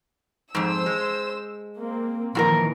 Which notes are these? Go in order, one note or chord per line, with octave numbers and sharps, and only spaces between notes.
F2 G#2 C5 E6
G#3
A#3 C4
F2 A#2 D#3 E3 F#4 A#4